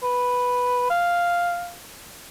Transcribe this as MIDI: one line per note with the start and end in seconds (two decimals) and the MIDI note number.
0.03 0.88 71
0.90 1.74 77